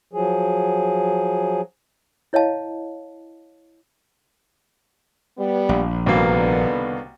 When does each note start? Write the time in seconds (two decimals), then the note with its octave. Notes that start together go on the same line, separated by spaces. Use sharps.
0.13 F3 F#3 G#4
2.33 E4 C#5 D#5 F5 A5
5.38 G3 B3
5.69 A#1
6.06 C2 B2 D3 D#3 A#3 B3